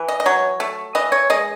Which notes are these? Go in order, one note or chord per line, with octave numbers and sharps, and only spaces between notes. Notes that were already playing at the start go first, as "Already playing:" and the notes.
Already playing: E3
D#5
D#5
F#3 C#5
A3
E3 D#5
C#5
G#3 D#5